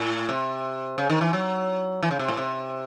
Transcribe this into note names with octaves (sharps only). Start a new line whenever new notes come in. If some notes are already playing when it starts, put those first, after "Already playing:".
Already playing: A2
C3
C#3
D#3
E3
F#3
E3
C#3
C3
A2
C3